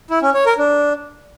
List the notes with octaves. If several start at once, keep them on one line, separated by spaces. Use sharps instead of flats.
E4
C#4
C#5
A#4
D4